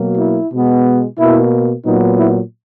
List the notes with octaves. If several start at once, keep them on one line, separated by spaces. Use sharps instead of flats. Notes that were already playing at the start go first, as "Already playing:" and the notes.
Already playing: B2 F#3 A#3
E4
B2 G#3 B3
B2 A#3 E4
A#2 F#3 B3 D#4
E4